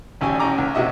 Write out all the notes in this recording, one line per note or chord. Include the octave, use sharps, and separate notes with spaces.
A1 D2 C#4 G4 G#5
A1 C#4 G4 A#5 D6
C#2
C#2 C3 F#4 D#5 E5